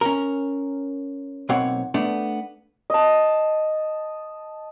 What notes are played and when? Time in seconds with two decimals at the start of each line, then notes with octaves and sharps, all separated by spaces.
0.01 C#4 A#4
1.49 B1 A#3 C4 C#5 F#5
1.94 A3 B3 D4
2.90 D#5 A5